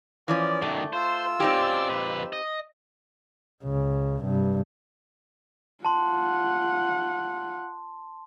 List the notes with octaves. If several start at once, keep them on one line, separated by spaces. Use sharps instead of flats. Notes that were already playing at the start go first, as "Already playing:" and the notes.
E3 F3 C#4 D5
F#2 D#3 A3
F4 C5 E6
C4 C#4 D#4 G4 D5
F2 B4
D#5
C#2 C#3
G2 C3
F4 F#5 A5 C6